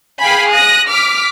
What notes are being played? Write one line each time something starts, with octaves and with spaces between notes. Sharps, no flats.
G#4 F5 G5 G#5 B5
D#6 F#6 A#6
D6 F6 B6